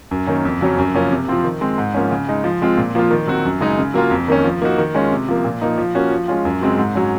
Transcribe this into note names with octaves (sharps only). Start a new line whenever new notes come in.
F#2
D#3 A#3 C#4
F2
C#3 F#3 C#4
F#2
C#3 F3 A#3 C#4
C3
F3 C4 F4
D#3
G#3 C4
G#2
F3 A#3 C#4
C#3
G#3 D#4
F3
G#3 C4 F4
A#2
F3 A#3 F4
D#3
F#3 C4 F#4
F#2
C#3 G#3 D#4
C#3
F#3 A#3 F4
F2
D#3 A#3 C#4
F3
A#3 D#4 F#4
D#3
G#3 C#4 F4
C3
F3 A#3
A#2
F3 A#3 D#4
F3
A#3 C#4 F#4
F3
G#3 C#4 F4
F#2
C#3 G#3 C4 F#4
G#2
F#3 C#4